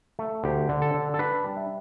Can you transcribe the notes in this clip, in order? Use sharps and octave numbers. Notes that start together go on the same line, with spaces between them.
A3
D2 G4
D3
A4
D3
A4
D4 B4
G3
E5